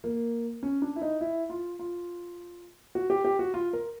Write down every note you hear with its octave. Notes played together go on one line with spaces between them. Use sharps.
A#3
C#4
D4
E4
D#4
E4
F4
F4
F#4
G4
G4
F#4
F4
A#4